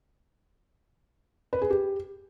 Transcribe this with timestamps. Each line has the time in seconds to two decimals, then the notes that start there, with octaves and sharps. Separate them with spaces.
1.53 B4
1.62 G#4
1.70 G4